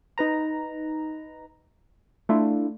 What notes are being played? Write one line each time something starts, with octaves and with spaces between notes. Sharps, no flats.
D#4 B4 A#5
A3 D4 E4 F4